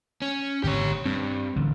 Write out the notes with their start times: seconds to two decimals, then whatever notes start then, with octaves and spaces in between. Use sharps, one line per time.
0.22 C#4
0.64 G#1 B2 D3 G4 C#5
1.05 G2 C4
1.56 A1 D3